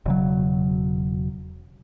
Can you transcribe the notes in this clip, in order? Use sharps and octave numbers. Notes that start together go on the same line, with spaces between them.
E1 C#3 F#3